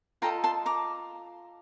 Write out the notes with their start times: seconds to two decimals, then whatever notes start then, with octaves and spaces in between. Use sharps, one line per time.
0.22 F4 A4 D#5 G5 A#5
0.44 A5 C6
0.66 A#5 D6